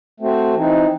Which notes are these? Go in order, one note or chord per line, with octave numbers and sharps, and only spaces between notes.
A3 C4 F#4 C5
E3 C4 D#4